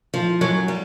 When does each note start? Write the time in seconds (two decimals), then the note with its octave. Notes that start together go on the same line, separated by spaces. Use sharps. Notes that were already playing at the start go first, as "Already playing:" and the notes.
0.14 F3
0.41 F#2 F#3
0.68 G3